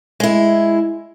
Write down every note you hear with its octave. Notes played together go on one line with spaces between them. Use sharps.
G#3 E4